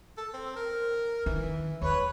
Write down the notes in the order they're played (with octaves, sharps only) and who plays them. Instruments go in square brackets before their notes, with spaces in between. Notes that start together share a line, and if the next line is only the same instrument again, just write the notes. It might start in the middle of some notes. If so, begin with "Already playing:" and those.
[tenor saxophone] A4
C4
A#4
[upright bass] D#3 [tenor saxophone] E3
[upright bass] E2 [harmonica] B4 C#5